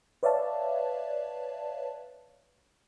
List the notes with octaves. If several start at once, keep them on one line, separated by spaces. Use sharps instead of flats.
B4 C#5 D5 E5 F5 A5